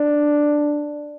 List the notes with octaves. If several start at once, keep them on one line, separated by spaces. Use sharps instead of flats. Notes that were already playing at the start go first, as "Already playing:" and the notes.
Already playing: D4